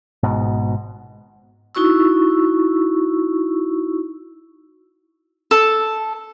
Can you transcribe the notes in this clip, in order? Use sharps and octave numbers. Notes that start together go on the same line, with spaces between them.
G#1 G#2 B2
D#4 E4 F#4 C#6 E6
A4